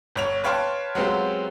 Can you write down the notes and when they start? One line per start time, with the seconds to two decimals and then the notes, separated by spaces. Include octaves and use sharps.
0.16 G1 C#5 F7
0.44 B4 C#5 F5 G5 A5 C6
0.95 F#3 G#3 B3 C4 F4 G4